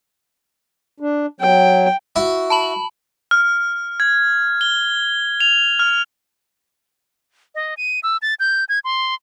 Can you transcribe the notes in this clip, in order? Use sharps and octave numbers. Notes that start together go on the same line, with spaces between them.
D4
F#3 G5
E4 F#4
A5 B5 F#7
F6
G#6
G7
F7
F6
D#5
D#7
E6
A6
G6
G#6
C6